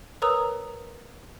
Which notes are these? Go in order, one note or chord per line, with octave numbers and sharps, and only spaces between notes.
A#4 B4 C#5 A#5 D#6 E6